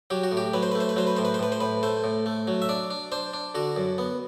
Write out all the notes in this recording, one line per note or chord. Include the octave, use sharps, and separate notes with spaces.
F#3 G4
F#4
A2
G4
F#3 B4
C5
A3 B4
C5
B4
F#3 C5
B4
A2 C5
B4
C5
A2 B4
C5
A2 B4
A3 C5
A2
A3
F#3
E5
D4 D5
D4
D4 C5
D4
D3 F#4
F#2
B3